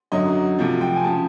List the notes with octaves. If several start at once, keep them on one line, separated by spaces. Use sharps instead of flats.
F#2 D3 F#3 D#5
D2 C3 F3
G5
G#5
C#3 F3 A5